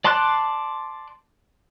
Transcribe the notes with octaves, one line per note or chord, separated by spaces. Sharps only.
D5 A5 C6 D6 F#6